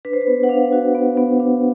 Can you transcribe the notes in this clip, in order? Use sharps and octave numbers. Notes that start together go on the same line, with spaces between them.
D4 B4
C5
B4
B3
F#5
D4 F5
F#4
B3
B3
D4